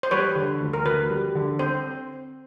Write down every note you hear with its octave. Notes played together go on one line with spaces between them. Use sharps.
C5
G3 B4 C#5
D3
D2
A#4
D2 B4
G3
D3
C4 C5